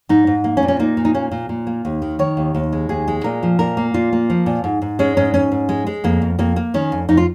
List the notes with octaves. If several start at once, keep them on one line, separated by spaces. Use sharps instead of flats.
G#2 D#4
G#2
A#3
C#4
A#2
C#4
A#3 D#4
A#2
D#4
A#3 C#4
A#2
A#2
A#3
D#2
D#3
D#3 C#5
D#2
D#2
G#3
D#2 G#4
G#3
A#2 A#4
F3
A#2 A#4
A#3
A#2 F4
A#3
F3
A#2
G#2
G#2
G#3 C#4
G#2 C#4
G#2 C#4
G#2
G#3
G#3
F2 A#3
F2
F2 A#3
A#3
D#3 C#4
F2
F2 D#4
F4